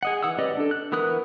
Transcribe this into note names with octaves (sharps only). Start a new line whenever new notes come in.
G#4 D#5 F#5
E3 F#5 D#6 E6
C#4 G4 B4 D5 D#5
D4 A4
F#6
E3 B3 A#4 D#6 F#6